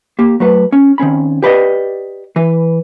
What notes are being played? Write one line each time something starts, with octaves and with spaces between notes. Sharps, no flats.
A#3 G4
F#3 A3 B4
C#4
D#3 C4 C#4 B5
G4 B4 D5 D#5
E3 B4